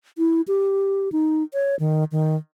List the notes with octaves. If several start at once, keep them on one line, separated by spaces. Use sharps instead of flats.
E4
G4
D#4
C#5
D#3
D#3